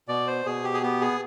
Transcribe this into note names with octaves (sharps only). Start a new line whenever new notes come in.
B2 D5
C5
B2 G#4
G4
G#4
B3 G4
G#4